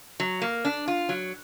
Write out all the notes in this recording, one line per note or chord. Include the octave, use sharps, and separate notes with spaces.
F#3
A#3
D4
F4
F#3